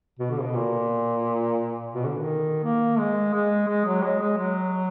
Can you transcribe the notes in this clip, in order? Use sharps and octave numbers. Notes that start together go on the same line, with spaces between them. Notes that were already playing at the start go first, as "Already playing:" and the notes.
B2
D3
B2
A#2
B2
D3
D#3
A#3
G#3
G#3
G#3
F#3
G#3
G#3
F#3